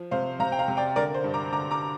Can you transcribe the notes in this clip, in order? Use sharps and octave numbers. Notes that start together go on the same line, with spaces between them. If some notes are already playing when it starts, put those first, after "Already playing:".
Already playing: F3
C3 C5 F5
C3 F5 A#5
G5
F5 A#5
C3
D5 G5
D3 A#4 D5
C5
G2
A#5 D6
D3 A#5 D6
A#5 D6